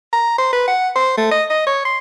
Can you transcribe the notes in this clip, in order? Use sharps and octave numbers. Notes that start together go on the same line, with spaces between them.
A#5
C5
B4
F#5
C5
A3
D#5
D#5
C#5
C6